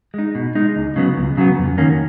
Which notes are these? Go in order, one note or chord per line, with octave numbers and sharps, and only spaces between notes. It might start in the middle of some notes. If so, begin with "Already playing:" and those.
G#3 D#4
B2
G#3 D#4
C#2
C#3 F#3 B3
C#2
C#3 F#3 B3
F2
D#3 A#3 C#4